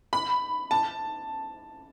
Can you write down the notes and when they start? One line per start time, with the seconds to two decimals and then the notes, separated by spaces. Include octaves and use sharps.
0.13 B5
0.71 A5